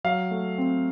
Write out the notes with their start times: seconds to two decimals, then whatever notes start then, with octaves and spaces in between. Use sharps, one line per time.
0.04 F#3 F5
0.31 A3
0.58 C4